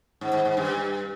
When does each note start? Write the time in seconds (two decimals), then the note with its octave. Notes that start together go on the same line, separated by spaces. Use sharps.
0.21 G#2
0.33 G#2
0.45 G#2
0.57 G2